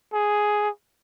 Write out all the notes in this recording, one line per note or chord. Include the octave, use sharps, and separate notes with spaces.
G#4